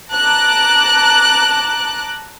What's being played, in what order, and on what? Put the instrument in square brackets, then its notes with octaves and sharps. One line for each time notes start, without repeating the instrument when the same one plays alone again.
[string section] A5 A#5 D6 F#6